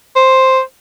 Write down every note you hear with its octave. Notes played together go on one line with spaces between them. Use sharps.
C5